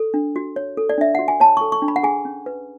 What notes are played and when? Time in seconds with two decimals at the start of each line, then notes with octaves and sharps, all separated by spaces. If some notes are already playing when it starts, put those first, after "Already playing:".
Already playing: A4
0.14 D4
0.36 F#4
0.56 C#5
0.77 A4
0.89 D5
0.98 D4 E5
1.15 F#4 F#5
1.28 G#5
1.40 C#5 A5
1.57 A4 C#6
1.72 C#6
1.82 D4
1.88 B5
1.96 F#5
2.03 G#4 G#5
2.25 C#4
2.46 B4